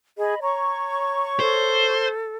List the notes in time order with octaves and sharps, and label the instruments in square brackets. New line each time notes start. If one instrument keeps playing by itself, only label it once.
[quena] G#4 [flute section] D#5 B5
[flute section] C#5 C#6 [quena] A#5
[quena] A4 [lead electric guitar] C5